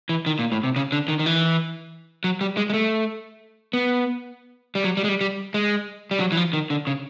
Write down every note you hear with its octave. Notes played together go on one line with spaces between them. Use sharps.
E3
D#3
A#2
A2
C3
C#3
D3
D#3
D#3
E3
F#3
G3
G#3
G#3
A3
B3
G3
F#3
G3
G#3
G3
G3
G#3
G3
F#3
E3
F3
D#3
D3
C#3